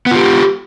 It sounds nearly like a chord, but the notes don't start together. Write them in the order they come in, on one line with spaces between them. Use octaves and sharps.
B3 F4 G4